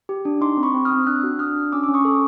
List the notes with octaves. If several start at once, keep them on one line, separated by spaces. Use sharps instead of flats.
G4
D4
D#4 C6 D6
C4
B5 C#6
C4
D#6 F6
C4
D4 E6 F#6
F#4
D4 D#6 F6
D4
C#4 D6 E6
C#4 D6
C#6 D#6
A4